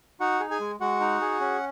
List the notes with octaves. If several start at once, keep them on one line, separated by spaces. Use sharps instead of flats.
D#4 F#4 F#5
G#4
G#4 G#5
G#3
G#3 F#4 F#5
D#4
G#4
C#4